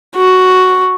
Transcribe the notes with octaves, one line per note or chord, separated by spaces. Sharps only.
F#4